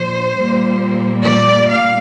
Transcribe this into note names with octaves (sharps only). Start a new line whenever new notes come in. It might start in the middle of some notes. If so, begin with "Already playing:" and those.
Already playing: A#2 F3 D4 C5
A#2 G3 A#3
D5
F5